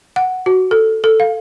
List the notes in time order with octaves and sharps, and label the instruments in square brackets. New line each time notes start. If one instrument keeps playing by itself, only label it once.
[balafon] F#5
F#4
A4
A4
F5